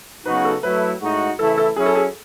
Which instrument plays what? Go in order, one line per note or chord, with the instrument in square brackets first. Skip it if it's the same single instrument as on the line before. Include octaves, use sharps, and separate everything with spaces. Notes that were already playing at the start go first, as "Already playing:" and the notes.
[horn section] C#3 F#3 B3 D#4 F#4 [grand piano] B4
[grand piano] A4
[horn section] F#3 A3 E4 [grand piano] B4
[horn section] A2 G#3 D#4 F#4
[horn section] C#3 E3 A3 E4 [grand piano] A4
[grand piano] A4
[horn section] F#3 C#4 E4 [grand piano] G#4
[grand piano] A4
G#4